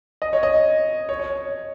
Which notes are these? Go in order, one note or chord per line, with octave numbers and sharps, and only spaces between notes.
D#5
C#5
D#5
C#5
C#5